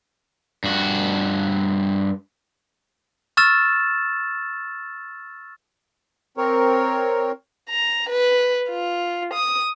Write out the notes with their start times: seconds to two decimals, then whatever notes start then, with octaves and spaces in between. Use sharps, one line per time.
0.64 G2 F#4
3.37 C#6 E6 F6 A6 E7
6.37 C4 A#4 C#5
7.69 A#5
8.09 B4
8.70 F4
9.33 D#6